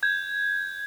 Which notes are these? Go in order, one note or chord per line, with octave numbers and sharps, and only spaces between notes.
G6 G#6